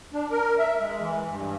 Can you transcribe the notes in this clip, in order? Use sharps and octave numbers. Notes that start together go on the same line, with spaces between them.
D4
A#4
E5
G#3
E3
G2